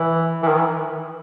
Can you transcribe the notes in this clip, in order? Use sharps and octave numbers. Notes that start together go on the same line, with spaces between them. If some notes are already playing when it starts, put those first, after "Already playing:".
Already playing: E3
E3
D#3
E3